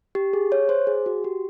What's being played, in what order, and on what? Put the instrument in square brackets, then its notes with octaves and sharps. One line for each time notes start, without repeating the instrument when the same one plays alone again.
[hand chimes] G4
G#4
C#5
C5
G#4
F#4
G4